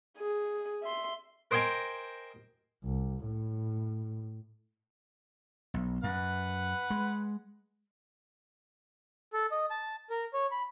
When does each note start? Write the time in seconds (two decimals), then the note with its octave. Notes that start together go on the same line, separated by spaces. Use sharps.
0.17 G#4
0.83 E5 C6
1.51 A#4 C5 D#5 G5 G#5 A#5
2.84 C2
3.25 A2
5.74 B1
6.04 F#2 B4 F#5
6.90 G#3
9.33 A4
9.51 D#5
9.70 A5
10.10 A#4
10.33 C#5
10.51 B5